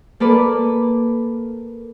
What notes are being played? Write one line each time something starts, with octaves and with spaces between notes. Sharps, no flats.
A#3 A4 B4 D5